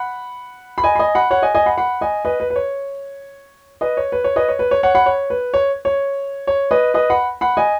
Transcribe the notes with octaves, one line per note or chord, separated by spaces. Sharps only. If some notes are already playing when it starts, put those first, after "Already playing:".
Already playing: F#5 B5
B5
D#5 G#5
B5
D#5 G#5
F#5 B5
C#5 F#5
D#5 G#5
D#5 G#5
F#5 B5
F#5 B5
D#5 G#5
B4 D#5
B4
B4
C#5
B4 D#5
C#5
B4
C#5
B4 D#5
C#5
B4
C#5
C#5 F#5
F#5 B5
C#5
B4
C#5
C#5
C#5
B4 D#5
B4 D#5
F#5 B5
F#5 B5
D#5 G#5